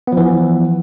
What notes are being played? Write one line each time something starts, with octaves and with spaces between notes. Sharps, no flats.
E3 F3 B3